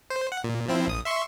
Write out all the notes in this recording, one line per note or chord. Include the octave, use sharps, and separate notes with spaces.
C5
F#5
A#2
F3 C4 E4
A#1 D#6
E5 C6 C#6